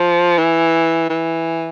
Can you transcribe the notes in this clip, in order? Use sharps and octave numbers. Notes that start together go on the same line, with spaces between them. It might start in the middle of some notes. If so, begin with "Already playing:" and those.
Already playing: F3
E3
E3